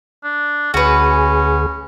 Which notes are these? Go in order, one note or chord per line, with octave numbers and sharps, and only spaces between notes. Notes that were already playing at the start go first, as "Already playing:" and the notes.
D4
D2 C#4 F#4 G#4 B4